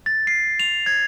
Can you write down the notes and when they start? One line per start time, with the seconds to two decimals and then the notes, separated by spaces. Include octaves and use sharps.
0.06 A6
0.27 C7
0.60 F7
0.86 G#6